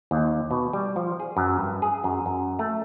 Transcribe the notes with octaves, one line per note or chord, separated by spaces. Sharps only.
D#2
B2
G3
F3
G#4
F#2
G2
G#4
F#2
F#2
A3